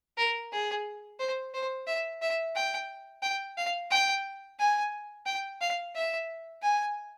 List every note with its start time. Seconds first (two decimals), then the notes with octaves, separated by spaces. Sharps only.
0.18 A#4
0.51 G#4
1.19 C5
1.54 C5
1.87 E5
2.22 E5
2.55 G5
3.22 G5
3.57 F5
3.90 G5
4.59 G#5
5.26 G5
5.61 F5
5.95 E5
6.62 G#5